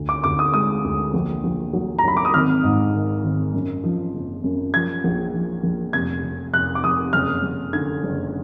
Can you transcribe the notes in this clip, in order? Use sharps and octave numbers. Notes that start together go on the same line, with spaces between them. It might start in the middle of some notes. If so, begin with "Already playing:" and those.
Already playing: D2
D6
D2 D6
D#6
G#3 D#6
D2
A#1
A#1
F#3
A#5
F#3 B5
D6
D#6
G#1 F6
G#2
D#3
G#1
F#2
F3
F#1
F#2
F3 G#6
A#1
F3
A#1
F1 G#6
F1
F1 F#6
D6
F1 D#6
F#1 F6
F#1
D3 G#6
F#1